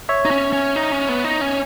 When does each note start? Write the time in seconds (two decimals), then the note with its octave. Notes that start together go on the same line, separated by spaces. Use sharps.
0.09 C#5 E5
0.25 D#4
0.31 C#4
0.53 C#4
0.76 D#4
0.92 C#4
1.09 B3
1.24 D#4
1.41 C#4